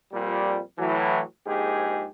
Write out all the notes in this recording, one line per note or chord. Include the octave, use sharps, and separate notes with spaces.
F2 A#2 G3
A2 E3 F#3
A#1 G#2 G4 G#4